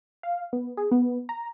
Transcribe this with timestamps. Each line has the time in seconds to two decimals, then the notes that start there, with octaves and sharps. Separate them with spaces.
0.23 F5
0.53 B3
0.77 G#4
0.91 B3
1.29 A#5